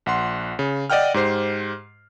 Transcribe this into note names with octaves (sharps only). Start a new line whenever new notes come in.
A#1 F#5 C6
C#3
D5 D#5 F#5 G5 F6
G#2 G4 C5 C7